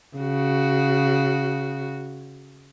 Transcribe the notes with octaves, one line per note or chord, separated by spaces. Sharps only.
C#3 F#4